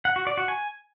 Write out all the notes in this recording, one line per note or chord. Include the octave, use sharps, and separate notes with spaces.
F#5
F#4
D5
F#4
G#5